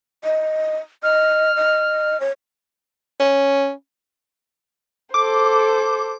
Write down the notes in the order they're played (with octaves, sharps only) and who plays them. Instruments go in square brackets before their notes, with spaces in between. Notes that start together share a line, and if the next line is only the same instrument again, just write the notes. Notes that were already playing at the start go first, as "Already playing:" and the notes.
[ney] D#5
[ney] D#5 [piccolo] F6
[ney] D#5
C#5
[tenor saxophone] C#4
[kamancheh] A4 C5 [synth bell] D6